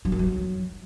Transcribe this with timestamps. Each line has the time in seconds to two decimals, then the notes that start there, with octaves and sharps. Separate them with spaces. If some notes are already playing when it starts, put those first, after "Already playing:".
0.05 F#3
0.12 F#2
0.19 F#3